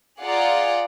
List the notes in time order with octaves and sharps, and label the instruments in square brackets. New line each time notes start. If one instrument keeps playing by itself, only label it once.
[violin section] F4 G#4 D5 F5 F#5 A#5